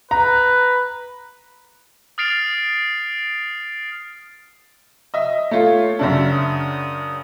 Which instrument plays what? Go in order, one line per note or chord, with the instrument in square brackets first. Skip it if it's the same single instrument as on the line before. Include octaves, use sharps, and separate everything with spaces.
[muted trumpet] B4 [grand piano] A#5
[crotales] D#6 F6 A6 C7 D7 F7
[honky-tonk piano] D#5 E5
[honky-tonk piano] A3 F4 [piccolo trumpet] C#5
[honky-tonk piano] F#2 C#3 D4 [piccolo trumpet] E5
[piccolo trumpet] D#6